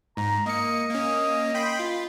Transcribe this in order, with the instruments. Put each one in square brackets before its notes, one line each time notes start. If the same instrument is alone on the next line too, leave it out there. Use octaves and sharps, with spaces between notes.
[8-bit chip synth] G#2 [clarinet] A#5
[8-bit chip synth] A#3 C#7 [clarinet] D#5
[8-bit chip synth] A#3 C#4
G5 B5 C6
F4